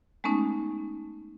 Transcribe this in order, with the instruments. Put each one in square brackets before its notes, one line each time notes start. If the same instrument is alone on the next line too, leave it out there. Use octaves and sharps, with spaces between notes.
[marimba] G#3 A3 B3 C#4 D#4